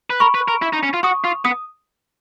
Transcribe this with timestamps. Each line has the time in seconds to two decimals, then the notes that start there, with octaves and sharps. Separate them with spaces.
0.10 B4
0.20 A#4 B5 C#6
0.35 B4
0.48 A#4
0.62 E4
0.73 D#4
0.83 C#4
0.94 F4
1.03 F#4 C#6 D#6
1.24 F4
1.45 B3 D#6